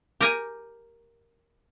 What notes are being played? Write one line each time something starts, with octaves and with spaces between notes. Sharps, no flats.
G4 A#4 G#5